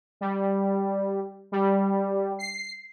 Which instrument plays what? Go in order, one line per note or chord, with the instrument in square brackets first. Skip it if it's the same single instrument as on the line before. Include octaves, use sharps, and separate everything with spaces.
[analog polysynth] G3
G3
C7